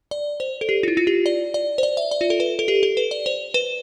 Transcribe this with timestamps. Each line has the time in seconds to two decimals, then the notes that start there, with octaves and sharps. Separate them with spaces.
0.11 D5
0.40 C5
0.61 A4
0.69 G4
0.83 F4
0.88 E4
0.97 F4
1.07 G4
1.26 D5
1.54 D5
1.78 C5
1.83 D5
1.97 E5
2.11 D5
2.21 F4
2.30 A4
2.40 B4
2.59 A4
2.68 G4
2.83 A4
2.97 B4
3.11 D5
3.26 C5
3.54 B4